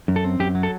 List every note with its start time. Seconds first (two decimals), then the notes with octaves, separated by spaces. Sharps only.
0.08 F#2
0.16 A4
0.24 C4
0.40 F#2 G4
0.55 F#3
0.63 A4